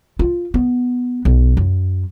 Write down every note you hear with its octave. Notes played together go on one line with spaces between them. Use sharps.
F4
B3
B1
F#2